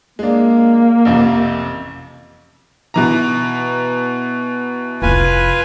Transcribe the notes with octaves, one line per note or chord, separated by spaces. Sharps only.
G#3 A#3 D4
A1 F2 C3
B2 E3 A#5
F1 E4 F4 B4 G#5